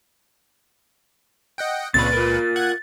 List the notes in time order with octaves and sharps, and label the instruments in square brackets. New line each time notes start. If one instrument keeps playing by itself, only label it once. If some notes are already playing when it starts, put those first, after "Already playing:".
[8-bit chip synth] D#5 F#5 G5
[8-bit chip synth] C#2 A#2 B4 [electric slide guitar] C4 C#4 D5 [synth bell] A6
[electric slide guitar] F4 A#4
[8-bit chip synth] F#5 F#6 G#6